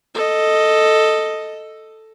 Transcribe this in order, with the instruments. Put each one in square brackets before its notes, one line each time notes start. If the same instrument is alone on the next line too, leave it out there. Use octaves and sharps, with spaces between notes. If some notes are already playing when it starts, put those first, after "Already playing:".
[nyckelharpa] A4 D#5